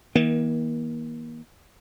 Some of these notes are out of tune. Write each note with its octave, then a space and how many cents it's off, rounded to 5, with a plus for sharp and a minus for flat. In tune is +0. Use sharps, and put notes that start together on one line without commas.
D#3 +45 A#3 +30